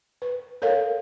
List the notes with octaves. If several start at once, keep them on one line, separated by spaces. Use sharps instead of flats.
B4
A4 A#4 C#5 F5